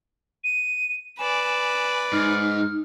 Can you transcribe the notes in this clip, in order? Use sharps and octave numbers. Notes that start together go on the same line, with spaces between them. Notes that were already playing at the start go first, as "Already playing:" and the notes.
D#7
B4 D5 G#5 E7
G#2 D#4 F6